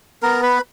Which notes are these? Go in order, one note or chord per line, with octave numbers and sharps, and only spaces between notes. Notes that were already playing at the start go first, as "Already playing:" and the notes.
B3 A#4 A#5
B4 B5